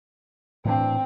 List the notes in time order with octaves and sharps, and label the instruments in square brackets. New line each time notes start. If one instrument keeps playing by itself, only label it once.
[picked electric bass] A2 E3 D4 [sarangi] C4